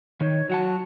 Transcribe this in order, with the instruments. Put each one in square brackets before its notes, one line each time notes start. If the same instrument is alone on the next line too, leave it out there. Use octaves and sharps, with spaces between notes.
[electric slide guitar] D#3 D#4 [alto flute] C#5
[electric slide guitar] F#3 F#5 A5 [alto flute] F#4